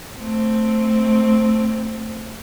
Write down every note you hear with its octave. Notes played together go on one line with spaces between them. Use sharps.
A3 C4